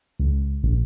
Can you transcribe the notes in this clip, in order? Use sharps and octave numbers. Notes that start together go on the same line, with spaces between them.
C#2
A#1